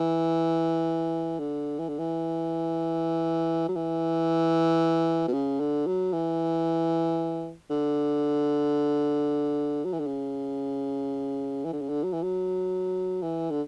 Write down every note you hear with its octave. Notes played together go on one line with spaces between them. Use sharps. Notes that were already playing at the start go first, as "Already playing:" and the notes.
Already playing: E3
D3
E3
D3
E3
F#3
E3
B2
C#3
D3
F#3
E3
D3
F#3
E3
D3
C#3
E3
D3
C#3
D3
F#3
E3
F#3
E3
D3